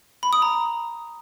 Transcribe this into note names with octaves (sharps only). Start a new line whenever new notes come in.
B5
D#6
A#5